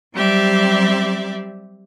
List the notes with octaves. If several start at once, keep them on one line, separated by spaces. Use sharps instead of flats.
F#3 G3 C4 G4 D5 E5